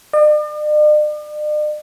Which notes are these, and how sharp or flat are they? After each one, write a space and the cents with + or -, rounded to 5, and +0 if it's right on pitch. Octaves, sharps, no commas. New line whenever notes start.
D5 +45